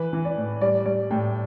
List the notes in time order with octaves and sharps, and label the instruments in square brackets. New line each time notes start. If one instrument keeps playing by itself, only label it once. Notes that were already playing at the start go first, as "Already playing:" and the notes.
Already playing: [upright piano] E3 B4
E3
D5
A2
G3 D5
G3 D5
A2 G5